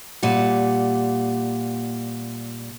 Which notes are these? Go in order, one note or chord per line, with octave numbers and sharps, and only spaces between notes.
A#2 G3 F#5